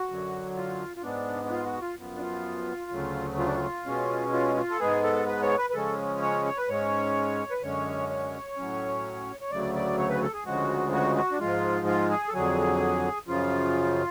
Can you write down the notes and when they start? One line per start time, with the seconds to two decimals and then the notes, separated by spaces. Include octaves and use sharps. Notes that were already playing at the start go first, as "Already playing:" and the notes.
Already playing: F#4
0.09 F#2 D3 F#3
0.56 F4
0.97 F4
1.03 G#2 G#3 B3 D4
1.45 D4
1.50 F4
1.66 F#4
1.81 F4
1.97 F#2 F3 B3
2.16 D4
2.21 F4
2.91 D2 C#3 F#3 A3
3.39 F4
3.47 D4
3.55 F4
3.86 B2 G#3 C#4
4.33 F4
4.56 F4
4.70 A4
4.80 G#2 G#3 B3 G#4
5.03 A4
5.27 B4
5.42 C#5
5.58 B4
5.70 B4
5.74 C#3 F3 G#3 C#4 A4
6.22 C#5
6.45 C#5
6.57 B4
6.68 G#2 G#3 C#4 C#5
7.51 B4
7.63 F#2 D3 G#3 C#4 C#5
8.09 C#5
8.57 A2 F#3 C#4
9.41 C#5
9.51 D2 C#3 F#3 A3 D5
9.75 D5
9.98 C#5
10.09 B4
10.22 A4
10.33 G#4
10.46 D2 C#3 F3 G#3 F#4
10.92 F#4
11.16 F#4
11.32 D4
11.40 G#2 F3 G#3 F4
11.87 F4
12.10 G#4
12.28 A4
12.34 F2 D3 F#3 G#4
13.28 F#2 C#3 F3 F4